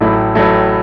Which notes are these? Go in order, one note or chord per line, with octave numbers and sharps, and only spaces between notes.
A1 A2 F#3 A3 E4
A1 A2 F#3 A3 E4